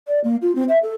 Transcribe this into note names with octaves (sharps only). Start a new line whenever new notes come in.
D5
A#3
F4
C4
E5
A4